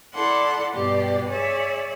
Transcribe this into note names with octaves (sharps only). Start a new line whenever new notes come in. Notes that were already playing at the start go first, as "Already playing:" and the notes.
E4 A4 D5 F#5 C6
G2 B2 G4 D5
G#4 C#5 D5 E5